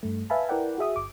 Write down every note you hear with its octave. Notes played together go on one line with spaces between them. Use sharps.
G2 A3
B4 E5 F5 G#5 A5 B5
E4 A#4 B4 D5 F#5 G5
F#4 G#4 E5 D#6
G1 D6